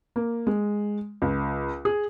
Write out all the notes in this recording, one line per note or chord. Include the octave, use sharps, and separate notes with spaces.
A#3
G#3
C#2
G#4